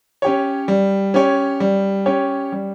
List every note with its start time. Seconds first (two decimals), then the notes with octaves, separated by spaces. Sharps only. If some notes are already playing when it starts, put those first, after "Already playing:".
0.22 C#4 G4 C#5
0.68 G3
1.14 C#4 G4 C#5
1.60 G3
2.06 C#4 G4 C#5
2.52 G3